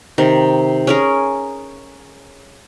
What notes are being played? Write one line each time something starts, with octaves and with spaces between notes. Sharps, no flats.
C3 D#3
C#4 G#4 A#4